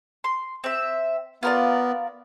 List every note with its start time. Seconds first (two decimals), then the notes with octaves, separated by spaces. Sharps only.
0.24 C6
0.64 C4 E5
1.43 B3 F4 A#4 D5